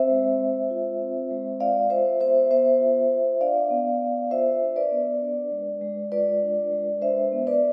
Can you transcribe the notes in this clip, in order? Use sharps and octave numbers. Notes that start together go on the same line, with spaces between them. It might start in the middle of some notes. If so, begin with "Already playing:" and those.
Already playing: C4 C5 E5
G#3
G#3
F4
C4
G#3
F4 D5 F5
F4 C5 E5
B3 C5 E5
B3 C5 E5
F4
F4
D4 D5 F5
B3
B3
F4 C5 E5
D4
B4 D5
B3
D4
G#3
G#3
F4 B4 D5
D4
G#3
D4 C5 E5
B3
B4 D5